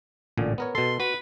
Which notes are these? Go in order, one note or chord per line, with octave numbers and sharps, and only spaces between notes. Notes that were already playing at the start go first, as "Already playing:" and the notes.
A1 A#2 D3
B3 A#4 C#5
B2 A4 C6
F#4 B4